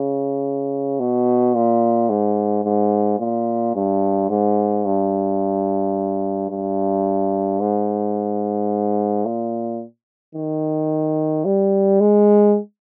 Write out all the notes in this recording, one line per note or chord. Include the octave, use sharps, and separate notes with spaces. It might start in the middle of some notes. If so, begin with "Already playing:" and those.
Already playing: C#3
B2
A#2
G#2
G#2
A#2
G2
G#2
G2
G2
G#2
A#2
D#3
G3
G#3